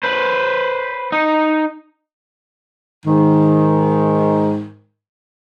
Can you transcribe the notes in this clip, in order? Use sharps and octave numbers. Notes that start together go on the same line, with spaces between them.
B4 C5
D#4
G#2 D#3